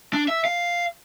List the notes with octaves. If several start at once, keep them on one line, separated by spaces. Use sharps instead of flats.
D4
E5
F5